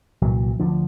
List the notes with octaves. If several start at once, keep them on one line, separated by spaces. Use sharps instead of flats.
C2 A#2 E3 F#3
D2 D3 F3 D4